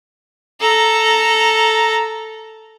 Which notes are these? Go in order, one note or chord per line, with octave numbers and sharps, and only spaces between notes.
A4 A#5